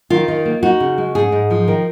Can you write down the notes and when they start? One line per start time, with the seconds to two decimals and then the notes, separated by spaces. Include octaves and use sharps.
0.10 D#3 F4
0.28 D#3
0.45 A#3
0.63 D#4 F#4
0.80 C#3
0.98 G#3
1.15 G#2 G#4
1.32 G#2
1.50 F3
1.67 D#3 A#4